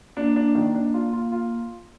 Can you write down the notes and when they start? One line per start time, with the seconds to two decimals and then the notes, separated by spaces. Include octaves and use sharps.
0.17 A#3 D4
0.36 D4
0.55 D#3
0.74 D4
0.94 F4
1.13 F4
1.32 F4